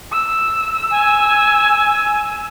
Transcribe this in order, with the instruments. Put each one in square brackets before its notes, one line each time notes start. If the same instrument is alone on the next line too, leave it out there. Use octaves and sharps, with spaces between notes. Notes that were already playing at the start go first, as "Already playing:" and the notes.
[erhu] E6
[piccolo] G#5